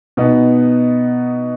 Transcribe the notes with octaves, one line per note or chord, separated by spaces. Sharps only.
B2 B3 D#4